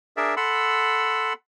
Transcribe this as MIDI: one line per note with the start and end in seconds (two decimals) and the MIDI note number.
0.17 0.35 62
0.17 0.35 68
0.17 0.35 70
0.17 0.35 74
0.17 0.35 76
0.37 1.33 69
0.37 1.33 78
0.37 1.33 83
0.37 1.33 84
0.37 1.33 88